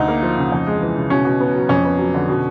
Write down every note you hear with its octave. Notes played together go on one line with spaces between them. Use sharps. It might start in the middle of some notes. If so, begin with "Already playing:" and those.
Already playing: D2 D#4
A#3
F3
C#3
F2
G#3
E3
C#3
B2 C#4
B2
B3
F#3
F2 C#4
B3
F#3
D3
B2